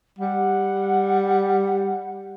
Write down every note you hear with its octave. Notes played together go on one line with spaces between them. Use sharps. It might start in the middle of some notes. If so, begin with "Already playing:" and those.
G3 F#5